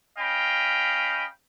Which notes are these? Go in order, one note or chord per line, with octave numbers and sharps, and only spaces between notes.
C#4 D#5 F5 G5 B5